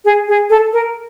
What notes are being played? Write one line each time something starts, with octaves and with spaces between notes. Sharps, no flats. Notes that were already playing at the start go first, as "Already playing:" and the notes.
G#4
G#4
A4
A#4